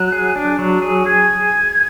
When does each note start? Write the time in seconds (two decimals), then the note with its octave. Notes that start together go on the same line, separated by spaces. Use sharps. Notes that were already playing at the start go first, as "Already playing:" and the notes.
Already playing: F#3 F#6
0.12 G#4
0.36 D4
0.59 F#3
0.82 G#4
1.06 G#4 G#6